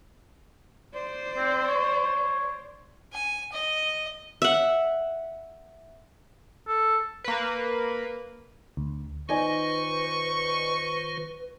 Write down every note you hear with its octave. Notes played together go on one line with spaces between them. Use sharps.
C5 D5
C4
C#5
G#5
D#5
E5 F#5
A4
A#3 B4
D2
D#3 D#4 F4 B4 C5 D5 G#5 C#6